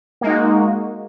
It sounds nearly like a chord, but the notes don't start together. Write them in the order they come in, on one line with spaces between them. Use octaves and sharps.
A#3 G#3 D#4 F#4